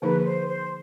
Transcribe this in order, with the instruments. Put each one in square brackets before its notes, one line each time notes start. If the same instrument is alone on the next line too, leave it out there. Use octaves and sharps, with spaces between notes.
[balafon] D3 F3 A#3 D#4 G#4 [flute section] B4
[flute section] B4
C5
C5